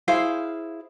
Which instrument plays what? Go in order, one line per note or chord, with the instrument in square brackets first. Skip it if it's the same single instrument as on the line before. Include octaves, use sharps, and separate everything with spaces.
[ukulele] E4 G#4 C5 F5